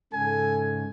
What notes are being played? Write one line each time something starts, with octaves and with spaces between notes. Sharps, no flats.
G#2 C#3 A4 G#5